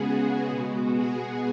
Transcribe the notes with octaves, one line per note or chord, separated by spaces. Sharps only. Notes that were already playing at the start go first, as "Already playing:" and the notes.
Already playing: C#3 G#3 B3 F#4 G#4
B2 G#3 B3 F#4
G#4